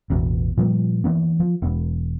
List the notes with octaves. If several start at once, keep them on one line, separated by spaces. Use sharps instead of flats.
A1 E2 B2
A#2 F3 G3 A#3
E3 A#3 B3
F3
E1 B3